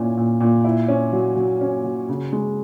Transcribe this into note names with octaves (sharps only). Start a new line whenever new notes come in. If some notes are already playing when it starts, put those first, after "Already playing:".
Already playing: A#2 C#4 E4
A#2
A#2
E4
C#4
F#3
F#3
C#4
F#3
C#3
G#3